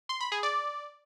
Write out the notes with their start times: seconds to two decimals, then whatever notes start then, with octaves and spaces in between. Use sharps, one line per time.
0.09 C6
0.21 B5
0.32 G#4
0.43 D5